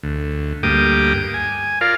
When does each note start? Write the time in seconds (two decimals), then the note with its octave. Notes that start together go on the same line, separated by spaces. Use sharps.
0.03 D2
0.63 D2 G2 A#3 G5 D6 D#6
1.34 G#5
1.81 F4 A#4 D5 F5